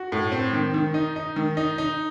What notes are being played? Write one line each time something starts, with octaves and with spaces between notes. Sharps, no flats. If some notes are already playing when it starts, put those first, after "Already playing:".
Already playing: F#4
A2
C4
D#3
D#3
D#4
D#4
D#3
D#4
D#4